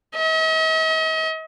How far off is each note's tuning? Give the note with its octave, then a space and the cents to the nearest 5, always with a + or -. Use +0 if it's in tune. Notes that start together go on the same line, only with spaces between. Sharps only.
D#5 +45